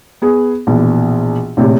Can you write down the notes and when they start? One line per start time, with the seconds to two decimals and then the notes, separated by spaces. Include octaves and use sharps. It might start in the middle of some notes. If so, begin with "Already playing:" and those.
0.22 B3 G#4
0.67 A#1 B2 E3
1.57 A#1 A2 C3